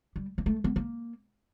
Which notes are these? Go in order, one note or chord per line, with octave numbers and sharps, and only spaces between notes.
G3
A#3
A3
B3
A#3